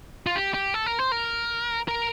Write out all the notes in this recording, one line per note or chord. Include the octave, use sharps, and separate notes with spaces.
F4
G4
G4
A4
A#4
C5
A#4
A#4